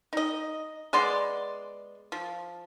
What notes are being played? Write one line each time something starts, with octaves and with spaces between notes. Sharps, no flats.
D#4 D#5
G#3 B3 D5 C6
F3